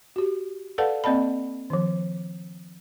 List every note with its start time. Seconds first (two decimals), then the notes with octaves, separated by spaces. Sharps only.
0.16 F#4 G4
0.78 A4 B4 D5 F5 F#5 A5
1.04 A#3 C4 D5 D#5 A5 B5
1.70 D#3 F3